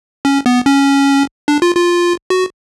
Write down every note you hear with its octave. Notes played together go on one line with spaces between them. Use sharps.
C#4
B3
C#4
D4
F4
F4
F#4